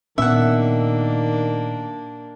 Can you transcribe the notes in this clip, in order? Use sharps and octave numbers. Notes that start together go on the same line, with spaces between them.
A#2 D#3 A#3 B3 C#4 D4 E5 F#5